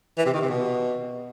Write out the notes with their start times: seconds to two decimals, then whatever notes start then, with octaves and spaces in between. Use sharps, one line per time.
0.18 E3
0.26 C3
0.34 D#3
0.41 C3
0.49 B2